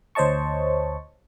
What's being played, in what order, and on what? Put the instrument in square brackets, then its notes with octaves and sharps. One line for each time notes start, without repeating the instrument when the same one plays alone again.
[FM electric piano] D2 C5 C#5 D#5 A5 C#6